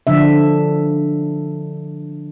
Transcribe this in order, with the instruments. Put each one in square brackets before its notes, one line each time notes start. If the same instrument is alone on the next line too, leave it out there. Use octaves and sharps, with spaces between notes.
[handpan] D3 F3 D4 E5